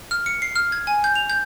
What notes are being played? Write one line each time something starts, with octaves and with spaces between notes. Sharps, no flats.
F6
C#7
C7
F6
G#6
G#5
G6
F7
G6